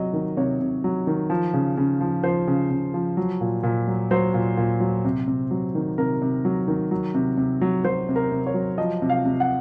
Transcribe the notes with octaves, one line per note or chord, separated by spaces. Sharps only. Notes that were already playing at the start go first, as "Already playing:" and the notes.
Already playing: C3 F#3 D#5
D#3
C3 C#5
C3
F#3
D#3
F3
C#3
C#3
F3
F3 C5
C#3
C#3
F3
F#3
A#2
A#2
F#3
F#3 C5
A#2
A#2
F#3
C3
C3
F#3
D#3
C3 A#4
C3
F#3
D#3
F#3
C3
C3
F#3
F#3 C5
C3
A#4
C3
C#5
F#3
F3 D#5
C3
F5
C3
F#5